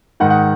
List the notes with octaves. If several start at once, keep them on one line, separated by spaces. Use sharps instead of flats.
G#2 D#3 F#5
F#5